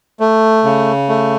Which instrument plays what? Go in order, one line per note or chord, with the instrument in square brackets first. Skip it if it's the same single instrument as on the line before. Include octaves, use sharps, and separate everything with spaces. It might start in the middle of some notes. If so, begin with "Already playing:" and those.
[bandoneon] A3
C#3
A3